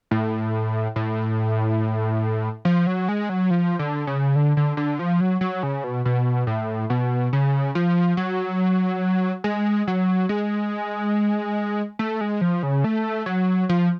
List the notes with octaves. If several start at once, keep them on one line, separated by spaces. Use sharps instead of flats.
A2
A2
F3
F#3
G#3
F#3
F3
D3
C#3
D3
D3
D3
F3
F#3
F#3
C#3
B2
B2
A2
B2
C#3
F3
F#3
G#3
F#3
G#3
A3
G#3
F3
C#3
A3
F#3
F3